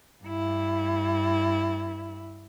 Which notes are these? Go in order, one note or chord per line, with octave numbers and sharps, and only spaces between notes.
G2 E4